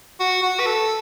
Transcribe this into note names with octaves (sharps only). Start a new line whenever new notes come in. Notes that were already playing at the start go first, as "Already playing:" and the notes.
F#4
F#4
B4
A4